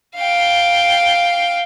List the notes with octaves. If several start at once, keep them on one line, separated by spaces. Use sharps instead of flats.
F5 G5